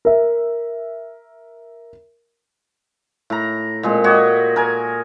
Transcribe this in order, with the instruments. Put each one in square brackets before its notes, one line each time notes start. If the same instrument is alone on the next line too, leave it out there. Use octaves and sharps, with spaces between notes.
[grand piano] A#4 E5
[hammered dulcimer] A2 A#5
A#2 G#3 C4
F#4 G4 C#5 D#5
A#4 G#5